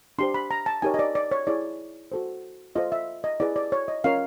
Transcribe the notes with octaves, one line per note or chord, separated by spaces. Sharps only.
D4 G4 C5 C6
B5
A#5
A5
D#4 G4 A#4 C#5 G#5
D#5
D5
D5
C#5
E4 G#4 C#5 D5
F#4 A4 C5
F4 A4 C5 D#5
E5
D#5
E4 G#4 B4 D5
D5
C#5
D#5
C#4 F4 A#4 C#5 F5